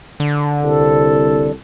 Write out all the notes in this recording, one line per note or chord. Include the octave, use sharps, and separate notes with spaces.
D3
C2 A4